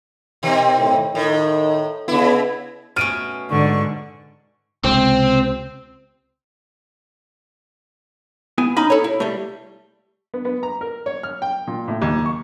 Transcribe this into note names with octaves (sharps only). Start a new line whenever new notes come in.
B2 D#3 C4
A2
A2 D#3
C#3 B3 E4
B2 A3 C#4 F6 D7 D#7
G#2 D3 D5 C#6
C#2 C3 C4
B3 E4 G#5
C#4 D#4 B5
A4 C#5
E4
G3 A3
B3
B3
A#5
A#4
C#5
F6
G5
A#2
A2
D#2
C#6